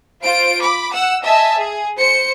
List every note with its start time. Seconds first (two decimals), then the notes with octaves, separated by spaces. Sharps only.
0.22 F4 C5 D7
0.61 B5 D6
0.91 F#5 E6
1.23 D#5 E5 G#5 A5
1.58 G#4
1.99 C5 C#7